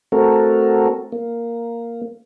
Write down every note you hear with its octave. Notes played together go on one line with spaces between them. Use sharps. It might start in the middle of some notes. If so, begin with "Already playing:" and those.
A3 C4 F#4 A4 A#4
A#3